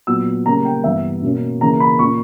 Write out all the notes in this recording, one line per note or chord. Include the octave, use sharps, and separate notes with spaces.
A#2 F#3 B3 E6
C#3 G3 A#3 C#4 A#5
G5
G2 E3 B3 E5
B2 A#3 C#4
C#3 E3 A#3 A#5
B5
A#2 A#3 C#4 C#6